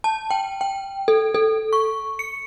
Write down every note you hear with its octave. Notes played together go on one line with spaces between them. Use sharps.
A5
G5
G5
A4
A4
C#6
C#7